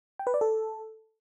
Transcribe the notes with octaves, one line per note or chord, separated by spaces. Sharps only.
G5
B4
D5
A4